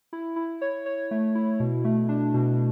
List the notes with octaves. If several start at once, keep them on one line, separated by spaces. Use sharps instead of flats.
E4
E4
C#5
C#5
A3
E4
B2
A3
D4
B2